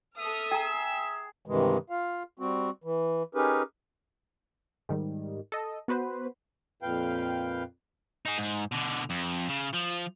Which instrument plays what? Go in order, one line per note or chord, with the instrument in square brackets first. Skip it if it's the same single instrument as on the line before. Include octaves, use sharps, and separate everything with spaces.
[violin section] A4 D#6 F6 [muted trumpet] E5
[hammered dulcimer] G#4 [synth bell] G5 A#5 [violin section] E6
[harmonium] G2 C3 D#3 E3 G#3
F4 F5
G3 C4 F#4
E3
C#4 D#4 G4 G#4 A#4 B4
[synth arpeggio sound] G#2 D#3 G3
A4 D#5
B3 F#4 B4 C5
[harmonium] F2 A#2 B4 F5 G5
[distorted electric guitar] D#4 G#4
G#2
B2 D3
F2
C#3
F3